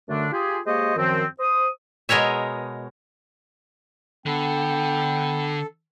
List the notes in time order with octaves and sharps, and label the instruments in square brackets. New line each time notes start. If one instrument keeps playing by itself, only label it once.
[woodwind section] F#2 D3 A3 D4
F4 G4 G#4
G#3 A#3 G4 C5 C#5 D#5
F#2 D#3 F3 C4
C5 D#6
[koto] B2 G#3 A#4 C#5 E5
[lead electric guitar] D3 [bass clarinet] B3 [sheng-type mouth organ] A4 [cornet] G5